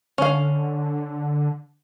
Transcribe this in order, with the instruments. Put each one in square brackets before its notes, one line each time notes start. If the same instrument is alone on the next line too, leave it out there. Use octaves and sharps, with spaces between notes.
[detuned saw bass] D3 [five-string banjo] C#4 F5